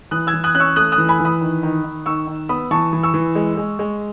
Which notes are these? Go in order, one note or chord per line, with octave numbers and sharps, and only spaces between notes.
E3 D#6 F#6
E6 G#6
E3
D#6 F#6
C#4 F#6
C#6 E6
A3 D#6 F#6
D#6 F#6
E3
G#5 B5
E3
B5 D#6
D#3
D#3
D#3
D#3 C#6 E6
D#3
B3 B5 D#6
E3 A5 C#6
E3
C#6 E6
E3
G#3
G#3
G#3